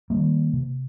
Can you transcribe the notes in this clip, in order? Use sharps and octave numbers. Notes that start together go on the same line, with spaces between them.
D#3 G3 A#3
C3